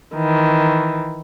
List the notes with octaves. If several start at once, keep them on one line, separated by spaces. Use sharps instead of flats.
D#3 E3